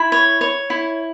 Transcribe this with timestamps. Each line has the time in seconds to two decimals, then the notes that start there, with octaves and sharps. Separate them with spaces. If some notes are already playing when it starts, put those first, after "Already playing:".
Already playing: E4 B5
0.12 C#5
0.41 C#5
0.70 E4